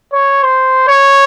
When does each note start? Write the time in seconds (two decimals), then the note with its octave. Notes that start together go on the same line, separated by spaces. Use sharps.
0.13 C#5
0.43 C5
0.88 C#5